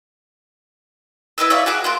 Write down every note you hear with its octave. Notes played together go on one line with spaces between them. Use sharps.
E4 B4 D#5 E6
C#5 D5 E5 F5
F#4 G#4 F#5 D6
A#3 C6 D6